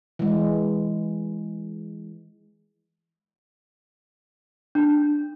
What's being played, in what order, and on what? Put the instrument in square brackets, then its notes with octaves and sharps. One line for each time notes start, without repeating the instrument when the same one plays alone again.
[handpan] E3 G#3
[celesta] D4